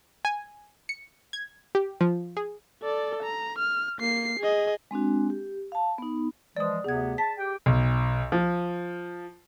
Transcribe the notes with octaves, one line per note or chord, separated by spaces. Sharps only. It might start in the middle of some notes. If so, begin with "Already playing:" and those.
G#5
C#7
G#6
G4
F3
G#4
A4 D5
A#5
F6
A#3 C7
G#4 D#5
G#3 C4 D4 F#4
G4
F5 A5
B3 D#4
E3 F3 G#3 D5 D#6
D2 C3 B3 G#4 G#6
A5 B6
G4 G5
B1
F3